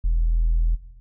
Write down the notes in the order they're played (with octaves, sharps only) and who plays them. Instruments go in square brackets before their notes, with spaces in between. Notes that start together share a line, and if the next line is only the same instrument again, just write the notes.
[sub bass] E1